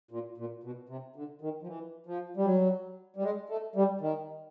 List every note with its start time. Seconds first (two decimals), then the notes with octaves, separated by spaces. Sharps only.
0.11 A#2
0.38 A#2
0.63 B2
0.89 C3
1.16 D3
1.41 D#3
1.62 F3
1.67 E3
2.06 F3
2.37 G3
2.45 F#3
3.16 G3
3.23 G#3
3.49 A3
3.76 G3
4.01 D#3